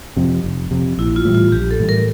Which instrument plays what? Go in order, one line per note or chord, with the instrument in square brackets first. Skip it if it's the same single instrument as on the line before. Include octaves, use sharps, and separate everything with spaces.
[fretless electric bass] F2 C3
F1
F2 C3
[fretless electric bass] A#1 [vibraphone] E4
[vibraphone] F4
[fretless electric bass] A2 E3 G3
[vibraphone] F4
[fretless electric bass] A#1 [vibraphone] G4
[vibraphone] A4
[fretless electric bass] A2 E3 G3
[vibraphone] A#4